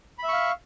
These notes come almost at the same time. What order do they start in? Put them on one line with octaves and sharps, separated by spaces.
B5 E5 C#6 F5